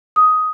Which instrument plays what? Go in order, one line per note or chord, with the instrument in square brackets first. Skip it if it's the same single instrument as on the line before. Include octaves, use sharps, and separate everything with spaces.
[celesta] D#6